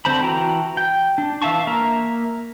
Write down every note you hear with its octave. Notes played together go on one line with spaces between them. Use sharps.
D3 C4 C5 A5 B5
E3 F#4 G5 A5 A#5
G5
D4
E3 E5 F5 A5 C#6
A#3 A#4 E5 A#5